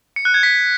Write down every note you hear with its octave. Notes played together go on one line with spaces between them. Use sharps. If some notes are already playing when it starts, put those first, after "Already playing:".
C#7
F#6
G#6
B6